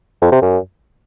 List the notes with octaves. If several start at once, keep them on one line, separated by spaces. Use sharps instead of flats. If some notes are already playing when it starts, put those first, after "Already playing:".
F2
C3
F#2